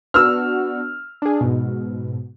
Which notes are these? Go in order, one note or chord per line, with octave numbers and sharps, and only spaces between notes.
B3 D4 F#4 E6 F6
D4 G#4
G#2 B2